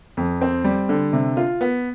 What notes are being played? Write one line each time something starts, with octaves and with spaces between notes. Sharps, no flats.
F2
C4
G3
D3
C3
F4
B3